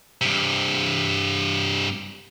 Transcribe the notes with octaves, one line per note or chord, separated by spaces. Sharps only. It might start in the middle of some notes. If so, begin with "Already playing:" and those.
G2 C3